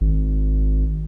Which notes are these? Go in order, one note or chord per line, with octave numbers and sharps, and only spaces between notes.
G#1